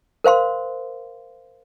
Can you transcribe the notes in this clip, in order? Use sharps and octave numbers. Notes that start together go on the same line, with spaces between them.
A#4 C5 F5 C6